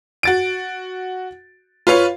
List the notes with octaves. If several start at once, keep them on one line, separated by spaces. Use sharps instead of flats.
F#4 A6 D7
F4 B4 C#5 F5